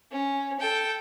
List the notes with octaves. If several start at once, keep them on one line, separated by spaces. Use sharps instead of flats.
C#4
A4 G5